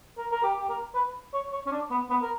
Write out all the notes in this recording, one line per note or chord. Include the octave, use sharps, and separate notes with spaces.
A#4
A#4
G4
G4
A#4
B4
C#5
C#5
C#4
D4
B3
B3
A#4